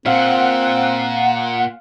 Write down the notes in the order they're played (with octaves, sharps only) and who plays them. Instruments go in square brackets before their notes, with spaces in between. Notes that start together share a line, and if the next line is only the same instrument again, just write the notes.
[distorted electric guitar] A#2 [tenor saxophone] C4 [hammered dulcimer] F5 [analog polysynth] F#5